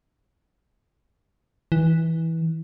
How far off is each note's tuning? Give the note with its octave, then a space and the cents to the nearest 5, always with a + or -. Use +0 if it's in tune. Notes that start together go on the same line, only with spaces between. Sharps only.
E3 -15